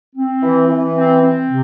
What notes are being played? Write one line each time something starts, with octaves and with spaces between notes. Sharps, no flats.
C4
E3
E3
C4
C4
C3